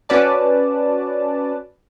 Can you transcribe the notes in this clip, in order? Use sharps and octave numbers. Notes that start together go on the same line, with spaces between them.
C#4 F#4 B4 D5 A5